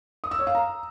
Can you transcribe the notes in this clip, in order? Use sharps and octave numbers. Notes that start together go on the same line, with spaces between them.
D#6
E6
C#5
F5
A#5